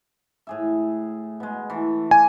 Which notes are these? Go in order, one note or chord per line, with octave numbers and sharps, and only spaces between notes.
A2 G#4 E5
B2 G#3
E3 A3
G#5 D6